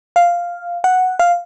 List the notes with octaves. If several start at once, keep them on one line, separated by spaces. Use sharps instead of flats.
F5
F#5
F5